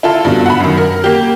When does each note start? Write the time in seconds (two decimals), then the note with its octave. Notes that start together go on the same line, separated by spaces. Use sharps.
0.03 E4 F4 A4
0.25 G2 B2
0.46 F#5 B5
0.60 F#2 D#3
0.77 A#4
1.04 A#3 G4